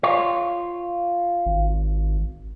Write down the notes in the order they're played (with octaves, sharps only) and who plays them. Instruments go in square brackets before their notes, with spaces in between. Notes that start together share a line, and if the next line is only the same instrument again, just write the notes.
[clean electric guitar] F4 C#5
[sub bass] G#1